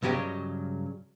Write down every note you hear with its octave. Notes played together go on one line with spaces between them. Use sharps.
G2 C#3 F#3 G4 D#5